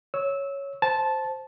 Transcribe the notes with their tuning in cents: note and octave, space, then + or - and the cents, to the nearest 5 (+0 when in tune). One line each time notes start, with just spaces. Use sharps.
C#5 +0 E6 -15
C5 +0 A5 -10